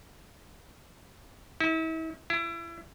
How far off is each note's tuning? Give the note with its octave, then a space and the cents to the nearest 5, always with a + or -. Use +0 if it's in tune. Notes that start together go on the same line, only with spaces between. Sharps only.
E4 -40
E4 +30